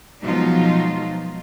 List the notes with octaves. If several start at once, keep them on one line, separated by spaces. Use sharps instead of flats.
B2 F3 F#3 G#3 D#4 F4